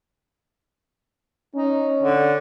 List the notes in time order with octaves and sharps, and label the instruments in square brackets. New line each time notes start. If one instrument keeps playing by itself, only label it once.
[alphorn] C#4 [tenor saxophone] D#4
[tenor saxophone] D3